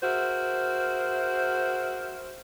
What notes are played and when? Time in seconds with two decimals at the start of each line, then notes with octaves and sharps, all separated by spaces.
0.03 F#4 G#4 A#4 C5 E5